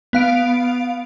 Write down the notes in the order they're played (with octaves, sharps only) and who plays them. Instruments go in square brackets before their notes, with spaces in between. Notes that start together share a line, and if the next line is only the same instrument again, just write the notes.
[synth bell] B3 F5 D7